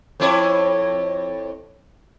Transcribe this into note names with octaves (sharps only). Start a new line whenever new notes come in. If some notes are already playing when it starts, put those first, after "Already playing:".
F2 E4 C#5